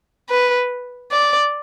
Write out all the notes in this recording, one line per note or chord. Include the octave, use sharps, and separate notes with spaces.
B4
D5